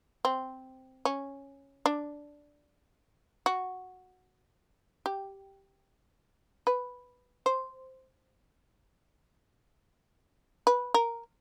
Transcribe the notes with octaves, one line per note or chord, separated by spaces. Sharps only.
C4
C#4
D4
F#4
G4
B4
C5
B4
A#4